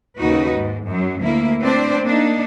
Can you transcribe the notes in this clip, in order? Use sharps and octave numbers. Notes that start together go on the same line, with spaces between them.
D#2 C#3 D#4 F#4 B4
G#2
F#2 F#3
D2 A#3 E4
A3 C4 D4 B4 C5 D5
A#3 D4 D#4